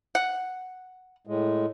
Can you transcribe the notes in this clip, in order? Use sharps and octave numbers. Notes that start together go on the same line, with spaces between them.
F#5
A2 G#3